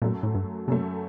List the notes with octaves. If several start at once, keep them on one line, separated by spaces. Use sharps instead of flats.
F#2 A#2 F#3 A3
A2
G2
F#2 C3 F#3 A3